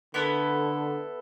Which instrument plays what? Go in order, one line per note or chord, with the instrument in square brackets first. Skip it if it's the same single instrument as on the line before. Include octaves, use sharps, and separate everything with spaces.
[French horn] D3 [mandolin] B3 E4 A4